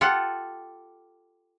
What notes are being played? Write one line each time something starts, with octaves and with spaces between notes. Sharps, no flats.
F4 G4 A4 F#5